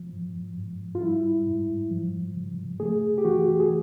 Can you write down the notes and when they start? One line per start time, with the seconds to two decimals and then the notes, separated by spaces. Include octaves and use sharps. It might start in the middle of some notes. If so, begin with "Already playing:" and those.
Already playing: F3
0.13 G#2
0.57 G#2
0.95 F4
1.02 G3 E4
1.47 G#2
1.91 F3
2.35 C#3
2.80 A3 G#4
3.18 G4
3.24 E3 F#4
3.60 G#4